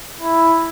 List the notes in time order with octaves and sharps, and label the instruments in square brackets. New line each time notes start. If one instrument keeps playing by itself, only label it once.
[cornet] E4